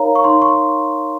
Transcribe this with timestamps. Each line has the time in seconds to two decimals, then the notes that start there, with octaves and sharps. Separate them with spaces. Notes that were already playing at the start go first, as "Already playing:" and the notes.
Already playing: D#4 A#4 C#5 F5 A#5
0.15 C#6
0.24 D#4 C6
0.42 C#6